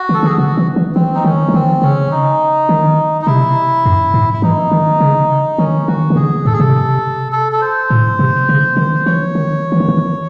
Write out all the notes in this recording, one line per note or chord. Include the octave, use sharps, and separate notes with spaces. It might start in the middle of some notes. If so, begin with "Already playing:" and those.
Already playing: F#4
D#3
A4
D#3
G#4
C#3 F#4
E3
E3
E3 C4
D#4
D#3 C#4
E3
D#3 C4
C#3 C#4
D#4
D#3
D#4
C3 E4
F#2
G#2
E4
E3 D#4
D#3
C#3
D#3 C#4
D#3 F#4
D#3
C#3 G#4
G#2 A4
G#4
C3 A4
A4
A4
C5
A2
C3
C#3
D#3
E3 C#5
D#3
E3
D#3
E3